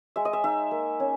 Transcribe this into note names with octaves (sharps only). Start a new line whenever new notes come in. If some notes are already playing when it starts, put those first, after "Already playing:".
G#3 E5
D#5
E5
D#4 E5
A#3
C#4